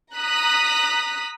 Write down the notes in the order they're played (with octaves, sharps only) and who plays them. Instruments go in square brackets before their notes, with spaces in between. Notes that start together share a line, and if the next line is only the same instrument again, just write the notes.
[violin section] A#5 D#6 F#6 B6